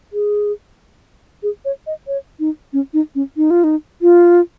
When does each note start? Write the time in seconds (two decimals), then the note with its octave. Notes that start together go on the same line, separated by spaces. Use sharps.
0.13 G#4
1.43 G#4
1.65 C#5
1.87 D#5
2.07 C#5
2.39 D#4
2.73 C#4
2.93 D#4
3.15 C#4
3.37 D#4
3.50 F4
3.64 D#4
4.02 F4